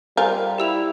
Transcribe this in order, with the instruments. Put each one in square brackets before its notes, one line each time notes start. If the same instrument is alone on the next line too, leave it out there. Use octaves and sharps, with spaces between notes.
[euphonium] G3 [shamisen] F4 G#4 A#4 [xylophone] C5
[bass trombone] E4 [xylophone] G4 E6 F7